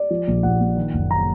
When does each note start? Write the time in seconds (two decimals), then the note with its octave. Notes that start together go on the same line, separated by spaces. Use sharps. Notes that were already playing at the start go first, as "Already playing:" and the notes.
Already playing: D5
0.11 F3
0.27 A#1
0.43 A#1 F#5
0.61 A#2
0.77 D#3
0.94 F#1
1.11 A#5